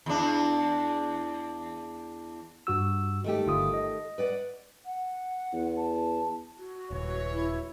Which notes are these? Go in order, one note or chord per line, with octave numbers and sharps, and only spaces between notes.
E2 D4
G2 F#4 E6
D#3 A3 G4
G1 F4 D#6
D#5
B4 D5 F#5
F#5
E2
A5
F#4
D#1 C#2 E3 C#5
E4